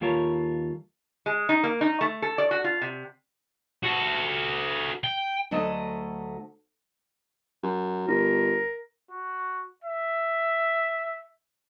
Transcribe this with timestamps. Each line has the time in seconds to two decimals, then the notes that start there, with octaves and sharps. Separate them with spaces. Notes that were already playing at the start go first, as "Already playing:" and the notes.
0.01 D#2 G3 F4 A4 A#4 C#5
1.26 G#3
1.49 D#4
1.63 A#3
1.81 D#4
2.01 A3
2.22 A4
2.38 D5
2.51 F#4
2.64 F4
2.81 C3
3.83 F#4 A4
5.04 G5
5.51 D2 F#3 A3 D#5 A5
7.63 F#2
8.08 G1 A#4
9.11 F#4
9.84 E5